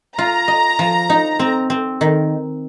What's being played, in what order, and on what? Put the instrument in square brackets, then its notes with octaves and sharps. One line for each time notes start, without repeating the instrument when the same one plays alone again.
[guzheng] F4 [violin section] A#5
[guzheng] D#5
F3
D#4
C4
C4
D#3